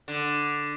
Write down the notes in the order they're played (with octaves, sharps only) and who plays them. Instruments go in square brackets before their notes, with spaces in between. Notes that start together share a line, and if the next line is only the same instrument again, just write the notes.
[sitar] D3